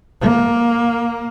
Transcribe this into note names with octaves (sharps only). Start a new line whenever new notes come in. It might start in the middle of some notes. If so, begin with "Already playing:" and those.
A#3